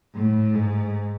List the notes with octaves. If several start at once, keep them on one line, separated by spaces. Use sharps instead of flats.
A2
G#2